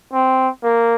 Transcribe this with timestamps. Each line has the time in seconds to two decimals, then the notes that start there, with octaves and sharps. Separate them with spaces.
0.13 C4
0.63 A#3